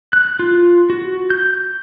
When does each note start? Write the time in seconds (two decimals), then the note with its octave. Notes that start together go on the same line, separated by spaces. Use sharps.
0.13 F#6
0.39 F4
0.90 F#4
1.30 G6